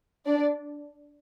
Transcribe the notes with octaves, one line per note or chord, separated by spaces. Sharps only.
D4 D5